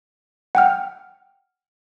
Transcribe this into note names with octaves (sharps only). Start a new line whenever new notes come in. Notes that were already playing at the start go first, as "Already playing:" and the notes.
F#5 G5 F6